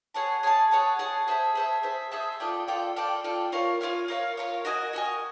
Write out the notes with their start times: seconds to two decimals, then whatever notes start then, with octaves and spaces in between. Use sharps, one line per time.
0.14 G#4 C#5 F#5 A5
0.43 G#4 C#5 F#5 A5
0.71 G#4 C#5 F#5 A5
0.99 G#4 C#5 F#5 A5
1.28 G#4 C5 E5 A5
1.55 G#4 C5 E5 A5
1.83 G#4 C5 E5 A5
2.12 G#4 C5 E5 A5
2.40 F4 A4 D5 G5
2.67 F4 A4 D5 G5
2.96 F4 A4 D5 G5
3.24 F4 A4 D5 G5
3.52 F4 A#4 C#5 F5
3.81 F4 A#4 C#5 F5
4.08 F4 A#4 C#5 F5
4.37 F4 A#4 C#5 F5
4.65 F#4 A#4 D#5 G#5
4.93 F#4 A#4 D#5 G#5